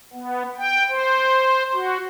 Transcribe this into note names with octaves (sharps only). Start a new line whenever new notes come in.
B3
G5
C5
F#4